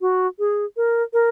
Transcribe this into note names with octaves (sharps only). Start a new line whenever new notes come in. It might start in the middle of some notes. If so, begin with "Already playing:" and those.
F#4
G#4
A#4
A#4